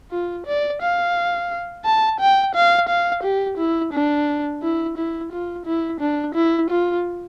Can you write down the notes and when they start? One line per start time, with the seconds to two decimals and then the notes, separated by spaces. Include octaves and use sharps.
0.11 F4
0.46 D5
0.82 F5
1.85 A5
2.20 G5
2.55 F5
2.88 F5
3.23 G4
3.58 E4
3.93 D4
4.62 E4
4.97 E4
5.32 F4
5.66 E4
6.00 D4
6.35 E4
6.70 F4